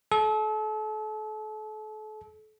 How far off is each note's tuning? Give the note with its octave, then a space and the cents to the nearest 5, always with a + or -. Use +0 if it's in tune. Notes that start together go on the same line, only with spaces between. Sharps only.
A4 -35